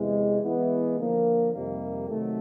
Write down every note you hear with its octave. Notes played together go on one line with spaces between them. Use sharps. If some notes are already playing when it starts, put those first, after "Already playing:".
Already playing: E2 C3 E3 G#3
E3 G#3 B3 E4
D3 F3 A#3
F2 C3 D#3 G3 A#3
C3 D#3 F#3 A3